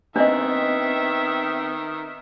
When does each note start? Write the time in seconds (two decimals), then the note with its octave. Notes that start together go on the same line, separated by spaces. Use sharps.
0.16 D#3 B3 C4 D4 D#5 E5